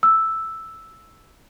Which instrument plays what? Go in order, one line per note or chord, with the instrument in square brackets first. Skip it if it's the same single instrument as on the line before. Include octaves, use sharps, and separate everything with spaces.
[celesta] E6